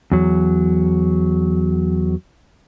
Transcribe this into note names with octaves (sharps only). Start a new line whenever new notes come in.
E2 F#3